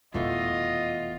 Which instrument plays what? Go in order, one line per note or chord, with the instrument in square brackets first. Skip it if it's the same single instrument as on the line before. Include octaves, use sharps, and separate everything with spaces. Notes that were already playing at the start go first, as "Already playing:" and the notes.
[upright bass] F1 B2 [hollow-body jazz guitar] E2 E3 A3 [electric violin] F4 [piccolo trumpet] D#5